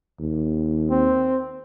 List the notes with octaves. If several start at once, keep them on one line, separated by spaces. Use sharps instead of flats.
D#2
C4